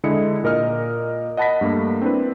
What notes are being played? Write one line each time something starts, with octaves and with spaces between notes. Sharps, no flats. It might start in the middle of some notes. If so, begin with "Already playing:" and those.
D3 G#3 E4 D#5 C#7
A#2 A#4 D#5 F6
D#5 F#5 A5 B5 A#6 B6
G2 A3 A#3
C4 D4 E4 B4